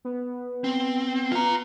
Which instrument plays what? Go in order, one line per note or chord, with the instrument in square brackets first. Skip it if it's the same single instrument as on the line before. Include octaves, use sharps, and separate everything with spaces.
[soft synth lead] B3
[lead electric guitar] C4
F4 A#5